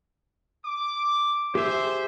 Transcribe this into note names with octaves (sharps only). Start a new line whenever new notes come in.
D6
G4 G#4 C5 E5